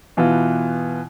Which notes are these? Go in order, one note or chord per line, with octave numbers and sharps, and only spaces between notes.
B2 E3 B3 F4